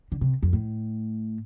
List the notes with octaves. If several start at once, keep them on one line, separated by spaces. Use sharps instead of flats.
D3
C3
F2
A2